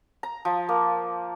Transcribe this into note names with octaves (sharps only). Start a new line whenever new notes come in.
A#5
F3
A#3